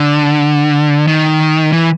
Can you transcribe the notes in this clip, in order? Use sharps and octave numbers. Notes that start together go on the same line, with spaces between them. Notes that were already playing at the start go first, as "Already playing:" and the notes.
Already playing: D3
D#3
E3